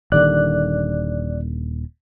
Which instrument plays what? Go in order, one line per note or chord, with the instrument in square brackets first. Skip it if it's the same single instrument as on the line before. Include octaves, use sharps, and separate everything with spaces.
[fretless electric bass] D#1 D#2 D3 [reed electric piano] D5 F#6